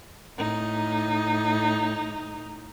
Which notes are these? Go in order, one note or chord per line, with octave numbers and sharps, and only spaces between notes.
A2 D#4